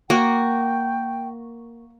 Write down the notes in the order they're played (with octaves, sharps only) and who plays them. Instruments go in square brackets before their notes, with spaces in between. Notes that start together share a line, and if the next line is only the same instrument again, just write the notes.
[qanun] A#3 [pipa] F#4 [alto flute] G5